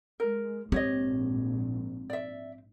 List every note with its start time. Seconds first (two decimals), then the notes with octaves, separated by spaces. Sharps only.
0.20 G#3 A#4
0.72 A#1 G#2 C4 G4 C#5 D#5
2.10 D5 E5